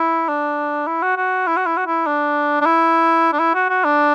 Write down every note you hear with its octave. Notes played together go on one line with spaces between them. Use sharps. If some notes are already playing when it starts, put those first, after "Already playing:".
Already playing: E4
D4
E4
F#4
F#4
E4
F#4
E4
F#4
E4
D4
D4
E4
D4
E4
F#4
F#4
D4